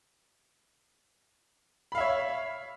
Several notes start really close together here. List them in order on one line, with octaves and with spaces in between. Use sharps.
B5 F5 E5 C#5